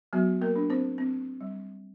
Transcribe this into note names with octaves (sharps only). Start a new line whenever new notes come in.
F#3 B3 F#4
A#3 A#4
D4
C4 C5
C4
G3